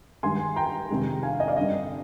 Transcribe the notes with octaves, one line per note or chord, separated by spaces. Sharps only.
G2 D#3 G#3 G#5 C6
G5 A#5
F2 C3 D#3 G#3
F5 G#5
D#5
D5 F5
G2 D3 G3 D#5